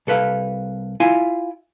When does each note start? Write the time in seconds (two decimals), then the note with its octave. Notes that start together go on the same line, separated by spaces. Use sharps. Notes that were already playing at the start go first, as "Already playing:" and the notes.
0.07 C2 A4 B4 F5
1.00 E4 F4 F5 G#5